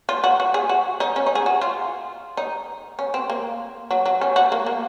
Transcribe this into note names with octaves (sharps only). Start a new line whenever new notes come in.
F4
F#4
F#4
G#4
F#4
D#4
C#4
D#4
G#4
F#4
F4
D#4
C#4
C4
A#3
F#3
F#3
C#4
F#4
A#3
A#3